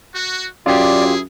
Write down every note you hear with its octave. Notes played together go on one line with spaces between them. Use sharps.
F#4
F#2 E4 F4 G4 G#4 D5